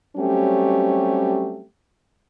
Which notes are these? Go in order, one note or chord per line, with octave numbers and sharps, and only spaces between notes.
F#3 G3 A3 C4 C#4 G4